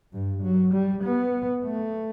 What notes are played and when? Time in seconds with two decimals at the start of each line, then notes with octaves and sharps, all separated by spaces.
0.13 G2
0.43 F#3
0.73 G3
1.03 B3
1.64 A3